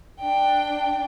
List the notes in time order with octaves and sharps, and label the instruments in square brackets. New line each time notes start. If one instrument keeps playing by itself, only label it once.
[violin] D4 G5